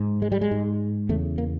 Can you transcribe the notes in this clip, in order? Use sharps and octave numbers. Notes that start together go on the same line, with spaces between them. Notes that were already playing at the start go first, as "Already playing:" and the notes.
Already playing: G#2
G#3
G3
G#3
G#2
E2 C#3 A3
A#3